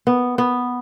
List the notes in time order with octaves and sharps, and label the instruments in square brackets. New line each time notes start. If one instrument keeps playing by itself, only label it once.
[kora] B3
B3